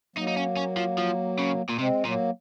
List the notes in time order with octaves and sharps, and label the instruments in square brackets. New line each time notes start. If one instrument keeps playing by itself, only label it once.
[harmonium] F#3 A#3 [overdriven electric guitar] D#4
[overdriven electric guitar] D#4
C#4
C#4
F3
F3
C#3
A#2
[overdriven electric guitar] C3 [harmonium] G#3 C4
[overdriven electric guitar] A#2 [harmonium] F#3 A#3